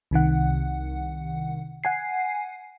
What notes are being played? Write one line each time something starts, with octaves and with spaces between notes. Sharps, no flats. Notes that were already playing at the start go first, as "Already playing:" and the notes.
C2 C3 D#3 F#5
F#5 G#5 C7